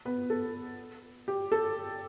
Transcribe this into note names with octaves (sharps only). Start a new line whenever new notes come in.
B3 B4
A4
G4
A4